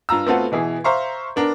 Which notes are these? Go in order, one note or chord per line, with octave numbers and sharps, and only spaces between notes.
G2 F4 A#5 E6
A3 B3 C4 F4 F#4 A4
B2 E3 E4 G#4
C5 E5 F5 A#5 C6 C#6
B3 D4 A#4